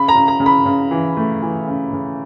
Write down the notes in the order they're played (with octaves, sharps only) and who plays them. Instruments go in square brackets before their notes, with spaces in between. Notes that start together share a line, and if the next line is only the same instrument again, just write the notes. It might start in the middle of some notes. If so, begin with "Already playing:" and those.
Already playing: [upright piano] C#3 B5
A#5
C#3
A#5
C#3
B5
C#3
E3
A3
E3
C#3
C#3